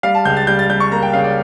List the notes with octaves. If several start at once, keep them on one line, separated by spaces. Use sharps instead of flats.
G3 F5
A5
C#2 G6
A6
G3 G6
A6
G3 G6
C#6
A#3 A#5
G5
C#3 F5
D5